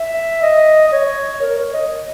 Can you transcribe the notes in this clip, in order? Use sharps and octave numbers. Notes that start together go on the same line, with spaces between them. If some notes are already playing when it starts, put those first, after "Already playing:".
Already playing: E5
D#5
D#5
C#5
A#4
C#5
D#5